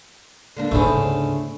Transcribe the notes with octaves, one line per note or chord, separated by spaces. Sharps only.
D3 A#3 D4
D2 G#2 C#3 A3 B3 E4 C5